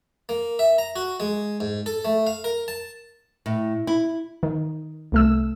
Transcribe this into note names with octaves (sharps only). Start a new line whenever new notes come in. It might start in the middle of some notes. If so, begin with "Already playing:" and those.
A#3
E5
A#5
F#4
G#3
G#2
A4
A3
F5
A#4
A5
A2
E4
D#3
C2 A3 E6